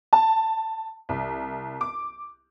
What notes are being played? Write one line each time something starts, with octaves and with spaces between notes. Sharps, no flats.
A5
C2
D6